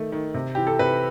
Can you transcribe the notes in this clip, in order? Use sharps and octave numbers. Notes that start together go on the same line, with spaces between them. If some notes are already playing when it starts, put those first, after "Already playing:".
Already playing: D#3 A3
D#3
C3
E3 G4
A4
C3 B4